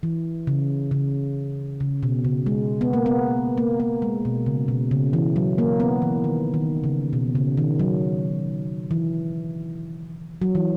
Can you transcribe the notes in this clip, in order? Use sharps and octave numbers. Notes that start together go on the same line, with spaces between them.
E3
C#3
C#3
C#3
B2
C#3
G#3
B3
A#3
B3
A#3
A#3
G#3
B2
C#3
B2
C#3
E3
F#3
A#3
B3
E3
D#3
D#3
C#3
B2
C#3
D#3
F#3
E3
F#3
E3